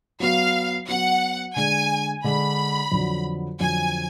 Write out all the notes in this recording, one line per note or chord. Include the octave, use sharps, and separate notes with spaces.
F#3 B3 F#4 F5
F#3 B3 F#4 F#5
D3 G#3 D4 G#5
D3 G#3 D4 B5
F2 D3 F#3
F2 D3 F#3 G#5